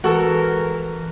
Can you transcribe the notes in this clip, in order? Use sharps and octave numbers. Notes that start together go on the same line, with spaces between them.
E3 G#3 F#4 A4 A#4